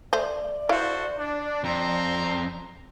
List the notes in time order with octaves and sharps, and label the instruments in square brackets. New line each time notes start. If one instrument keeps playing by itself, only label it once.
[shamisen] A3 C5 [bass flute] D5
[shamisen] E4 F5 [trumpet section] F#4 A4 C5
[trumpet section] D4
[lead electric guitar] F2 [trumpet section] C4 A#5 C6